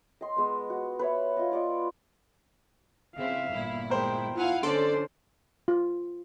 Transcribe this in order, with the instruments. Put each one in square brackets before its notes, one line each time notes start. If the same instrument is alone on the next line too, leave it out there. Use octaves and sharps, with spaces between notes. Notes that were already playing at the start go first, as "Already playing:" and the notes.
[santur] D#5 C6
G#3 B3
F#4
B4 C#5 E5
F4 D#5
F4 D5 D#5 C#6
[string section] C#3 C4 E4 [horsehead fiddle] E5 F5
[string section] G1 A#2 E4
[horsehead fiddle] G#3 G5 [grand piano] A#4 C5
[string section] E4 F5 G#5 [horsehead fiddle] F4 F#5
[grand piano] D3 [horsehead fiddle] C#4 C5 [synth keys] A4 C6 D7 [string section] D5
[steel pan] F4